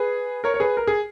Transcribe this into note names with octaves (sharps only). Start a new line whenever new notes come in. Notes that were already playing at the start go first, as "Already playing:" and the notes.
Already playing: G#4 B4
A#4 C#5
C#5
G#4 B4
A#4
G#4